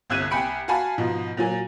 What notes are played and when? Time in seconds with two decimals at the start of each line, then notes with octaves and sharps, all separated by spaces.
0.10 G1 C2 E6 F#6 G#6 D#7
0.31 C2 G5 G#5 B5 C#7 D7
0.68 F#4 F5 G#5 A5 B5
0.98 G#2 B2 F3
1.37 A#2 F#3 G#5